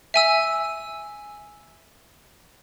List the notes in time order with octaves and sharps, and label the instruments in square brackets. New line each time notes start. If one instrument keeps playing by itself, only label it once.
[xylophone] E5 G#5 E6